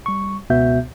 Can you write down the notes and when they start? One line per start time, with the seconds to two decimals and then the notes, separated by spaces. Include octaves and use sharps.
0.06 G3 C#6
0.50 C#2 B2 B3 F#4 E5 G6